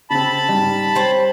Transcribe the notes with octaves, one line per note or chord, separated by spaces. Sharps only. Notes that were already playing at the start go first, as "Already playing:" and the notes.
C#3 C4 A5 B5
G#2 G3
G3 C4 C5 C#5